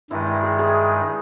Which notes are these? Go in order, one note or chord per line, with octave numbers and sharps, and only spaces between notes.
G2 D#3 G#3 E4
E4
G#4
G#4